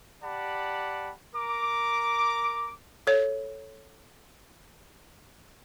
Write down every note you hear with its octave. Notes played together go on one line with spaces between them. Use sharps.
G4 D5 F#5 A5 B5
A#4 A#5 D6
A4 C#5